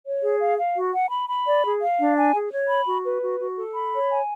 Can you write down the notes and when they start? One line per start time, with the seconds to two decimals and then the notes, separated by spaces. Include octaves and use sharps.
0.05 C#5
0.23 G#4
0.41 F5
0.58 F5
0.76 F#4
0.94 F#5
1.11 B5
1.29 B5
1.46 D5
1.63 G#4
1.82 F5
1.99 D4
2.17 G#5
2.35 G#4
2.52 C#5
2.70 B5
2.88 F#4
3.05 B4
3.22 F#4
3.40 F#4
3.57 A4
3.74 B5
3.93 C#5
4.10 G#5